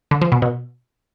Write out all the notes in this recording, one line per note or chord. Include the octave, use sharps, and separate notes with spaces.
D3
F3
B2
B2